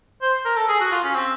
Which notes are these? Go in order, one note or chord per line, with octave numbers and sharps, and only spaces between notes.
C5
A#4
A4
G#4
F#4
F4
C#4
C4